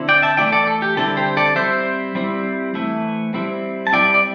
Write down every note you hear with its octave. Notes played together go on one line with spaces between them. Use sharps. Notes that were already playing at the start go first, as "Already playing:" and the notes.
Already playing: D3 C4 E4
D5 G5
E5 A5
E3 A3 E4 D5 G5
A4 D5
A4
G4
D3 G3 C4 E4 A4
G4 C5
A4 D5
G3 C4 E4 C5 E5
G3 C4 E4
E3 A3 E4
G3 C4 E4
A5
G3 C4 E4 D5 G5
D5